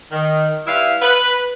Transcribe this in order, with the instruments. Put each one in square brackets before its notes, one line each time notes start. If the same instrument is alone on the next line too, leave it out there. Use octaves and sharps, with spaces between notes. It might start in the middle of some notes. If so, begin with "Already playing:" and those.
[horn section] D#3
G3 E4 B4 E5 F5
B4